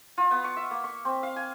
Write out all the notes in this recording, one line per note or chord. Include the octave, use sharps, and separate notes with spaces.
F4
B3
C#6
E5
A#3
C#6
C4
F5
G#5